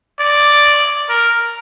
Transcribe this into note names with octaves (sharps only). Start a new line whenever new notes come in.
D5
A#4